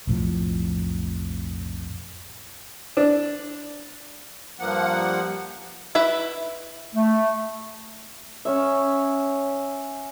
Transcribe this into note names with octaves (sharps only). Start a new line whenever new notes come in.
B1 F2 A2 F3
D4
G2 F3 A#3 F#5
E4 B4 E5
A3
C#4 C#5 E5